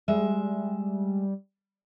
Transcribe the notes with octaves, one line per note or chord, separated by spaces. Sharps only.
G3 G#3 E5